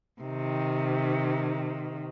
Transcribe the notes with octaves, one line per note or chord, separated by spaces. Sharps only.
C3 D#3